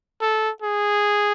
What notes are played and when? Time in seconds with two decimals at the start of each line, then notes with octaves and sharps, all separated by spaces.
0.22 A4
0.62 G#4